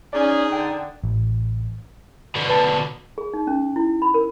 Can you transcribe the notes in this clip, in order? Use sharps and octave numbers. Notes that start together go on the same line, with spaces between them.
C#4 D#4 G#4 D5
D3 G5
A1
B2 D3
B4 A5
G#4
D#4
C#4
E4
B5
A#4